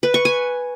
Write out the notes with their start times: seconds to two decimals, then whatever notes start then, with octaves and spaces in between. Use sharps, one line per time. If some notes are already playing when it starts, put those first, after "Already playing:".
0.03 B4
0.14 C#6
0.25 G#5